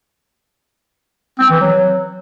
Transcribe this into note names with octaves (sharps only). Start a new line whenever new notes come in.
C4
E3
F#3